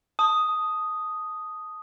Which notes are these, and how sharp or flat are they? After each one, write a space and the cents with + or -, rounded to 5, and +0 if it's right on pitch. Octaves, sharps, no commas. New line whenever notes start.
A5 +0 D#6 +0